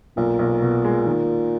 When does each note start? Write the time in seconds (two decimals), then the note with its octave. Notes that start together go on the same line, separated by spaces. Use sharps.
0.17 B1 A#2
0.39 B1
0.62 B2
0.84 G#3
1.06 D#3